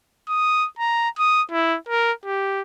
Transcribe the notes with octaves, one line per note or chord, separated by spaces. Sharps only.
D#6
A#5
D#6
E4
A#4
G4